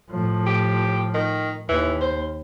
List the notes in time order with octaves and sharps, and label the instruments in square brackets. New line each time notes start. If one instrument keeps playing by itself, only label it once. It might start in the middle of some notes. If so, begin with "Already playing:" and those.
[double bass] A2 F3
[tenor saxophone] G4
D#3
[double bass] D#2 [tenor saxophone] E3
[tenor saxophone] C5